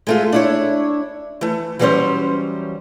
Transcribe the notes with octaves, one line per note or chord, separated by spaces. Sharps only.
G#3 A3 F4
D4 E4 C#5
E3 A3
E3 F#3 G3 A#3 C#4 C5